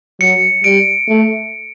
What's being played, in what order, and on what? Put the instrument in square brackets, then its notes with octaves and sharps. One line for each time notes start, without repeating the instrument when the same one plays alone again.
[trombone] F#3 [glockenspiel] C#7
[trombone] G3 [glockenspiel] D7
[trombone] A3